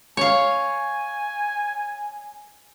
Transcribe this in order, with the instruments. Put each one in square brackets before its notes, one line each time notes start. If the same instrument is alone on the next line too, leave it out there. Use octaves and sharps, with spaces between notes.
[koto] C#5 F5 [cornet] G#5